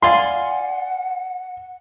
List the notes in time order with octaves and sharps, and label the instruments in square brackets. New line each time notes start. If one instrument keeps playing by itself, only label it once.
[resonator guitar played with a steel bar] D5 F5 G#5 [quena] F#5 [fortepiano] C6